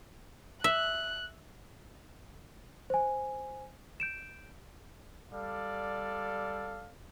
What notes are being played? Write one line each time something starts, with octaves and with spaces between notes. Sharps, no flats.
E5 F#6
C5 G#5
G6 D7 E7
G3 A4 D5 F5